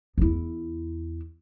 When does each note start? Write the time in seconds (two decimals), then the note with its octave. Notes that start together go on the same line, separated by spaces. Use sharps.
0.18 E2 E4